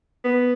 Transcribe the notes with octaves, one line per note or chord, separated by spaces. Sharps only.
B3